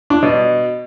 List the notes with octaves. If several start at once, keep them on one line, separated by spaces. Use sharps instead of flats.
D4
B2